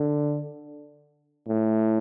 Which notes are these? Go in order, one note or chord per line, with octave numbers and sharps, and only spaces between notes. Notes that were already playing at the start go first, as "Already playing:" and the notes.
Already playing: D3
A2